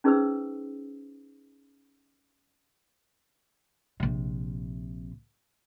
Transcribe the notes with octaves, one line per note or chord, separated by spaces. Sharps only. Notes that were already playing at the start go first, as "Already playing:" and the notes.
C#4 D#4 G#4 B4 C5 E6
A#1 C3